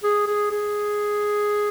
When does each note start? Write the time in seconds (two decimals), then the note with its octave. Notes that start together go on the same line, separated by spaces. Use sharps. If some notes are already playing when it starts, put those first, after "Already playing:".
0.04 G#4
0.27 G#4
0.51 G#4